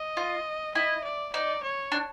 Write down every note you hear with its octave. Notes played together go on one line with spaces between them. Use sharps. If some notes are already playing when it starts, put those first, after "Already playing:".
Already playing: D#5
F4
E4 D#5
D5
D#4 D5
C#5
D4